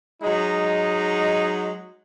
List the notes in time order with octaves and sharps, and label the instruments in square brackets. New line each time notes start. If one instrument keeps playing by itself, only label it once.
[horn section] F#3 G#3 D#4